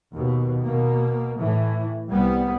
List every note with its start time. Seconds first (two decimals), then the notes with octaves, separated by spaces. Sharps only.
0.12 D#2 B2
0.64 B2 A#3
1.38 A2 E3
2.11 C2 G3 B3